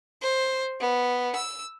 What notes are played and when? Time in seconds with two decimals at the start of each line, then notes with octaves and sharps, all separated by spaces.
0.22 C5
0.80 B3
1.35 E6